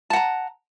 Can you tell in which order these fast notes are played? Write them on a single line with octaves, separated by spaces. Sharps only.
A5 F#5 A#5